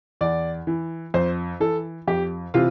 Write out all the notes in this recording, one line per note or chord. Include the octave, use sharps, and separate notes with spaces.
E2 D5
E3
F2 C5
E3 A4
F2 G4
C3 E3 F4